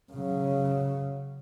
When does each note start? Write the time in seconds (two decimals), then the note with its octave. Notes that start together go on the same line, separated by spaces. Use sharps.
0.12 C#3 F#3